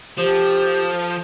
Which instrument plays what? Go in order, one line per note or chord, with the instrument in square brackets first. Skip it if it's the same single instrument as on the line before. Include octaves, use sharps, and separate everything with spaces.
[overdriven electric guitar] F3 [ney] G4 [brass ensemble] A4 A5 [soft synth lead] C5